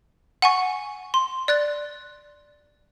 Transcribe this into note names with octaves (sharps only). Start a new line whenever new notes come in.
F#5 G#5 C#6
C6
D5 F#6 A6